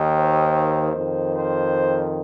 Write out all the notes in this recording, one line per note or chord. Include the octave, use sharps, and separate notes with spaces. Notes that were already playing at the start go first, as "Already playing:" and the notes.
Already playing: D#2 D#3
C5
F2 D#3
C5